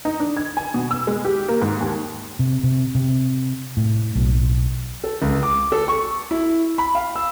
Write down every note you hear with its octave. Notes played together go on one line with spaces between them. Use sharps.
D#4
D4
G#6
G#5
B2
E6
G#3
G4
A#3
G#2
D#2
C3
C3
C3
A2
B1
A4
C#2
D6
A4
C#6
E4
B5
F5
E6